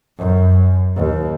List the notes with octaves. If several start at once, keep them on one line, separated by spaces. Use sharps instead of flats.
F#2
D#2